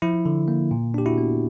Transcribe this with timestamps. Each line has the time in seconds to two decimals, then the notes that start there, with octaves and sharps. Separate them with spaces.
0.02 F3 E4
0.26 D3
0.48 A#3
0.71 A#2
0.94 D4 G4
1.06 E4 F#4
1.18 B3